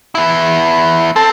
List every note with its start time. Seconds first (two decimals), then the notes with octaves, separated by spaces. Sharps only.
0.15 B3 E4
1.16 C4 A4